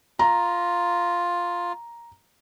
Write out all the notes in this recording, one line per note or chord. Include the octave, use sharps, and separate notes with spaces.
F4 A#5